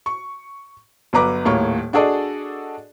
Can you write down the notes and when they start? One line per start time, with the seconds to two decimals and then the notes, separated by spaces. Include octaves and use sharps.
0.06 C#6
1.13 G1 F#3 B4 A#5 D6
1.45 D#1 A2 A#3 C#5 C#6
1.93 D4 F#4 G#4 A4 D5 D#5